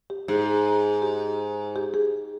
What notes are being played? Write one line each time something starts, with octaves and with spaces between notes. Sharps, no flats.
G4
G#2 G#4
G4
G4
G#4